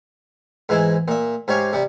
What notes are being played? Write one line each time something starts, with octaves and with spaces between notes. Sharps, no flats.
G#2 E3 G#3 E4
A#2 E5
G#2 G4 C#5 F5 G#5
C3 G3